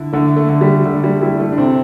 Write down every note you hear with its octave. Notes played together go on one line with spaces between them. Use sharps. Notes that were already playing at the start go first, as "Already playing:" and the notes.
Already playing: D3 E4
D3 A3
A3
D3
G3
D3 A3
G3
G3 E4
A3
D4
C3 C4